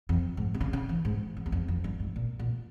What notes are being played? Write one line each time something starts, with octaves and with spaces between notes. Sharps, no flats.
F2
G#2
C3
C#3
C#3
E3
G#2
F2
E2
F2
F2
G2
G#2
A#2
A#2